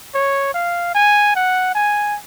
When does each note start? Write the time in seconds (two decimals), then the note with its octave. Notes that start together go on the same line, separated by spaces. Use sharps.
0.15 C#5
0.54 F5
0.95 G#5
1.35 F#5
1.75 G#5